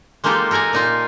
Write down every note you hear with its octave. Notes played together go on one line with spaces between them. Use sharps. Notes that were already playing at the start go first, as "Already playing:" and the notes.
G#3 A#3 D#4 F4 G4 A4
A4 A#4 F#5 G#5 A#5
A#2 D#4 F4